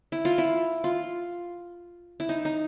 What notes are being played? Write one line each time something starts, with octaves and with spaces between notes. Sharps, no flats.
E4
F4
E4
F4
E4
D#4
D#4